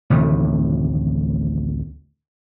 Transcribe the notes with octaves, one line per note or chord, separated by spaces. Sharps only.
A1 D2 C3 D#3